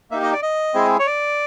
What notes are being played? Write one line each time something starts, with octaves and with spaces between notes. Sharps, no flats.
A#3 D#4 G4 E5
D#5
D5
D#5
G#3 C4 E4 G#4
C#5
D5